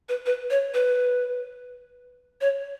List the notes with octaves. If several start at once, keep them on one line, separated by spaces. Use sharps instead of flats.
B4
B4
C#5
B4
C#5